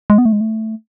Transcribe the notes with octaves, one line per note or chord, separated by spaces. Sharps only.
G#3
B3
A3
G#3
A3